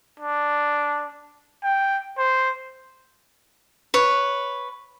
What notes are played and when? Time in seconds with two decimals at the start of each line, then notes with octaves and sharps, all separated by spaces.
0.19 D4
1.64 G5
2.17 C5
3.94 B4 C#5